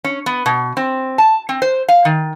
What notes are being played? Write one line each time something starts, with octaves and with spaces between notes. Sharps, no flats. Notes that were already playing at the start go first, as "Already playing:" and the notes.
C#4
B3
B2
C4
A5
C4
C5
F5
D#3